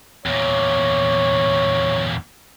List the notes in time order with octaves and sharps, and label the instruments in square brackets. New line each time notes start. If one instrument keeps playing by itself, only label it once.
[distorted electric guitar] E2 A#2 [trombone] C#5